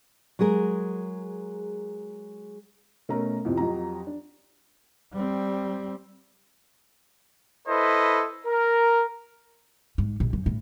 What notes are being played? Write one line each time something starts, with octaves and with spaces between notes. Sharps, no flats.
F#3 G#3 G#4 A#4
B2 A3 C#4 A#4 A#5
F2 A2 C3 E3 F3
F2 F3 F#3 G4 D#5 A#5
D4
G3 C4
E4 A4 B4 C5 D#5
A#4
G#2
A#1
F#2
A2